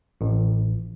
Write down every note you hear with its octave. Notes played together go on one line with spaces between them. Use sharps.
A1